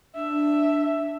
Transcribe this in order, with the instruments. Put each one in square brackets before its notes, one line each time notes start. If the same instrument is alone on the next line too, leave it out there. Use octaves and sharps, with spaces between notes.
[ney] D4 [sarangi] E5